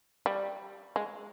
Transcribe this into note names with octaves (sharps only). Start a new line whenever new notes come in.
G3
G#3